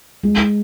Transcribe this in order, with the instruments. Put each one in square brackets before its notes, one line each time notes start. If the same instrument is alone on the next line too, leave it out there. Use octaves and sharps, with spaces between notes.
[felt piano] G#3